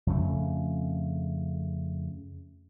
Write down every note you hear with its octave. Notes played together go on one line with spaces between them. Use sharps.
F2 C#3 A3